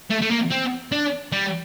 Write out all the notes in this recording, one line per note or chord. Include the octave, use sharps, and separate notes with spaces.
A3
A3
A#3
C4
D4
G3